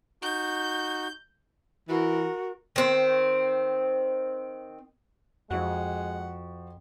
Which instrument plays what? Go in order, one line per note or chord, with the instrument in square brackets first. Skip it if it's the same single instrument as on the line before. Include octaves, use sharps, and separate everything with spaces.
[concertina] D#4 F#4 [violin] G6
[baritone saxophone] E3 [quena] F#4 [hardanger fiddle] A#4
[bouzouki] D#3 C4
[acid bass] F2 [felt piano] F3 F#4 [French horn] G#3 [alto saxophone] F#5